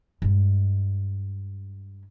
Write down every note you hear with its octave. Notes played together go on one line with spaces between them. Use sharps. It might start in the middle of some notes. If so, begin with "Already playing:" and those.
G2 G#3